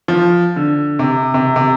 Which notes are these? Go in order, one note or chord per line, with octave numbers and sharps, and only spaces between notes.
F3
D3
C3
C3
C3